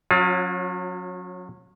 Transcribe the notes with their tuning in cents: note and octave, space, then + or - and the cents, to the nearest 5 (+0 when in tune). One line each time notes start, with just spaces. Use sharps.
F#3 -30 C#4 -15 F4 +25